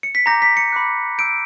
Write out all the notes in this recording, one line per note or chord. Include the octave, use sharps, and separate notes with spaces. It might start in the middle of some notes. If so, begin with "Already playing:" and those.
C#7
B6
A#5 D6 G6 A#6
B6
C#7
B5 D6 F#6
B5 E6 G6 D7